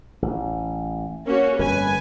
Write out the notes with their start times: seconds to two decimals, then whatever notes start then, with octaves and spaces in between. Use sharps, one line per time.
0.22 A1
1.25 A#3 C#4 F#4
1.59 G1 F2 B4 G#5